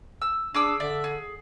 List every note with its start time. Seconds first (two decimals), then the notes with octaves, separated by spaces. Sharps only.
0.22 E6
0.54 D4 G#4 D6 E6
0.80 D3 D5 E5
1.04 G#4